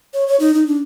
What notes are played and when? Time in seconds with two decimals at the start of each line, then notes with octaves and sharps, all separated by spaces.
0.14 C#5
0.28 C#5
0.40 D#4
0.54 D#4
0.67 D4